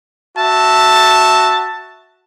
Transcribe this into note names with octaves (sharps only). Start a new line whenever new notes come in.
F#4 E5 A5